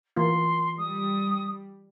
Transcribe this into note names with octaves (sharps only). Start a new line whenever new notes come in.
E3 A#3 F4 C6
G3 D#6